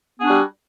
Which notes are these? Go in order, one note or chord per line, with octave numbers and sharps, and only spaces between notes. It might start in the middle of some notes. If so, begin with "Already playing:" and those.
G3 B3 D4 F#4 G#4